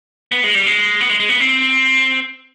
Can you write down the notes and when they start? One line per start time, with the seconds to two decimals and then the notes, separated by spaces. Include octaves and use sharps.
0.32 B3
0.44 G#3
0.55 G3
0.66 G#3
1.01 B3
1.10 G#3
1.20 G#3
1.29 B3
1.40 C4